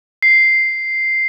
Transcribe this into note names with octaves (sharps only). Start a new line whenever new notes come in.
C7